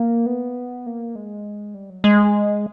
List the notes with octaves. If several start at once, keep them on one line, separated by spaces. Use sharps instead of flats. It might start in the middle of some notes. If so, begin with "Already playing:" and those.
Already playing: A#3
B3
A#3
G#3
G3
F#3
G#3